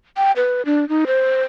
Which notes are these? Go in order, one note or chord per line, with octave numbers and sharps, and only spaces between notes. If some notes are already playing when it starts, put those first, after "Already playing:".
G5
B4
D4
D#4
C5